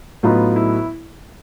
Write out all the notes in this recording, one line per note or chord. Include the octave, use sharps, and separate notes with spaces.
A2 F#3 B3 D#4 F4
E4